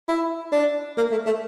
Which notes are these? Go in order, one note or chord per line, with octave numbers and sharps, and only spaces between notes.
E4
D4
A#3
A3
A3